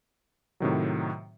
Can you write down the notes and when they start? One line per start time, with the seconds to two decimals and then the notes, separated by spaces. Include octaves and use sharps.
0.60 A2 C3 D#3 F#3